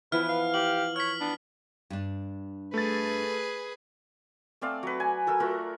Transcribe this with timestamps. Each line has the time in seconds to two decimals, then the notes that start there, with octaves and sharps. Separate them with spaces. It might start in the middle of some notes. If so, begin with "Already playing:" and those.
0.12 E3 F3 B3 E4 B4 F6
0.29 F5
0.54 G4 F#7
0.96 C#5 F6 B6
1.21 B3 D4
1.90 G2 D4
2.74 A3 G#4 B4 A6
4.61 A3 C4 D5 F5
4.83 F#3 B4
5.00 G#5
5.27 F#4 A4 A#4 E6
5.40 A3 F4 F#4 A#4